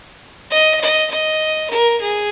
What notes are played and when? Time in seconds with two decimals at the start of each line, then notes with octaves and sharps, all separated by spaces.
0.50 D#5
0.81 D#5
1.10 D#5
1.70 A#4
2.00 G#4